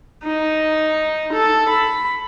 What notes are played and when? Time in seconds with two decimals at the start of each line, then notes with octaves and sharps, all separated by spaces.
0.23 D#4
1.33 A4
1.69 B5